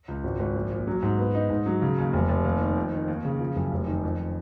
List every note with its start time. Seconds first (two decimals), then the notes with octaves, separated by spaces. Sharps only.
0.08 C#2
0.24 G#1
0.39 G#1
0.55 A#1
0.71 A#2
0.87 F#3
1.02 G#2
1.18 B3
1.35 D#4
1.50 G#2
1.66 F#3
1.82 C#3
1.98 D#2
2.13 F1
2.29 F1
2.45 D#2
2.61 D#3
2.77 F2
2.92 D#3
3.08 D#2
3.25 C#3
3.40 F3
3.56 F#1
3.72 F1
3.87 D#3
4.04 F2